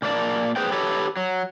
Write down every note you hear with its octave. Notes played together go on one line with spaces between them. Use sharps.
A#2 A#3 B4 D5 A5
G#4 B4 C5 G5
G4 A4 B4 C#5
F#3